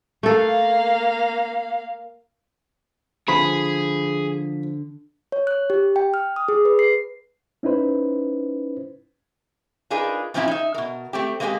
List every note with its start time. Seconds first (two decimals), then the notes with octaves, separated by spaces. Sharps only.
0.23 A3 A#3 A4 F5
3.28 D3 F3 G#4 B5 B6
5.32 C#5
5.47 F#6
5.70 G4
5.96 G5
6.14 F6
6.36 D#6
6.48 G#4
6.65 B4
6.79 C7
7.63 C#4 D#4 E4 B4 C5
9.90 D4 D#4 F4 G#4 A#4 B4
10.34 A#2 F3 C4 C#4 E4 F5
10.48 D#4 E5
10.74 B2 A#4
11.13 A3 C4 G4
11.40 G#3 A#3 C4 F4 G4 G#4